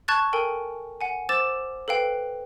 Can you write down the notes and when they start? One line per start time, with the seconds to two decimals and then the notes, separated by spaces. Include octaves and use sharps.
0.08 A5 C#6 F#6 G#6 A6
0.33 A4 A#4 G5 G#5
1.01 F#5 G#5
1.29 C5 D6 E6 A6 E7
1.88 A4 B4 F5 G5